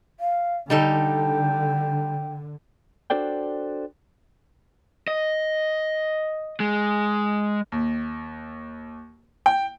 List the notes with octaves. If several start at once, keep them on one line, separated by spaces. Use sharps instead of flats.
F5
D3 G3 D#4 A4 G5
D4 F#4 A4 C5 D5 G5
D#5
G#3
D#2
G5